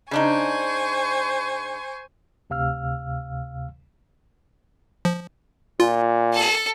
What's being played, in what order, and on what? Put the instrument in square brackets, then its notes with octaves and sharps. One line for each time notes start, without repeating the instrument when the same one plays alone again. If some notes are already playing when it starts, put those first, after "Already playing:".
[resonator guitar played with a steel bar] C#3 D4 D#4 [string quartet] C5 G#5 C#6
[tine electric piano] D2 C3 F5 E6 F6
[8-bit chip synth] F3
[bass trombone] A#2 [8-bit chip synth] F4
[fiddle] A4 A5